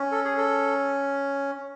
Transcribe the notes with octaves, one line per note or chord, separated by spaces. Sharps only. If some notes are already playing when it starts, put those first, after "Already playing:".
Already playing: C#4
A4
G#4
A4